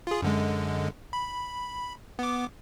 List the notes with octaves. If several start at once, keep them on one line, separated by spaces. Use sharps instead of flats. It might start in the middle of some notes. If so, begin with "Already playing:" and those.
F4 G#4
F#2 D3 G#3
B5
B3 D6